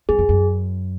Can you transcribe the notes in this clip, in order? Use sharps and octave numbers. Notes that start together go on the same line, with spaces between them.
F#2 G#4
F2
F#2